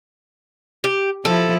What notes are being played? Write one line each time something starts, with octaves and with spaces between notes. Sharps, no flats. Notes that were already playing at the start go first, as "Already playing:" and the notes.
G4
F3 E4 A4